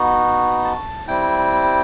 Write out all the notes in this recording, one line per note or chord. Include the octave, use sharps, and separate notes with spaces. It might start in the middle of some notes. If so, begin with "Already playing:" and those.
Already playing: B3 D#4 F#4
A5
G3 C4 E4 G5